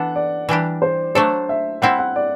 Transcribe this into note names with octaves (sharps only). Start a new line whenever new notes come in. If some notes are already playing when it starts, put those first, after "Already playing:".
Already playing: E3 B3 D4 A4 F#5
D5
E3 G3 D4 G4
C5
F#3 A3 D4 A4 C5
E5
G3 C4 E4 F#5
F#5
D5